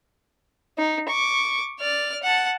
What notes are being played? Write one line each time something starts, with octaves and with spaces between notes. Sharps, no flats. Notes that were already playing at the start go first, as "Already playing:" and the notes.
D#4
C#6 D6
D5 F6
F#5 A5